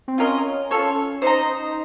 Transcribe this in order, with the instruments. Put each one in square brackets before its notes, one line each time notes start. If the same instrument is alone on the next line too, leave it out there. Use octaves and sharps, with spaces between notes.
[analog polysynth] C4
[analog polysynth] C#4 [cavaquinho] F4 A#4 D#5
[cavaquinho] F4 A4 C#5
[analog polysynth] D#4 [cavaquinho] C5 D#5 A#5